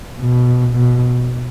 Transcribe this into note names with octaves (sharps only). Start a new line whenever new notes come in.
B2
B2